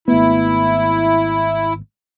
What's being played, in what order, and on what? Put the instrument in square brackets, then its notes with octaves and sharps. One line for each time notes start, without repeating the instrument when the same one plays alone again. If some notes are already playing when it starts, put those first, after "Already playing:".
[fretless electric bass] G#1 A3 B3 [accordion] E4